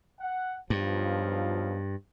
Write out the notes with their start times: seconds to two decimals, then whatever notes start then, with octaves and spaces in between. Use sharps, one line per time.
0.19 F#5
0.70 B1 G2 F3 F4